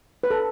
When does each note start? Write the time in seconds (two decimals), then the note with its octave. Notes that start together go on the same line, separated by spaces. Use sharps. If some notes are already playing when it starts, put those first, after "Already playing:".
0.23 B4
0.30 A4